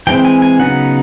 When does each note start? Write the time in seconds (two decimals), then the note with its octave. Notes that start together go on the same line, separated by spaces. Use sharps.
0.07 E3 G#3 C4 E4 G5
0.25 G#5
0.42 G#5
0.59 C#3 F#3 B3 D#4 F#5